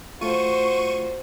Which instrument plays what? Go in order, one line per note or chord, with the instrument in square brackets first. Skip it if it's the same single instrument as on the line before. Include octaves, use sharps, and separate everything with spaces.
[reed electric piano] A3 F4 [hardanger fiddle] F#4 C5 [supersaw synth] C#6 D#7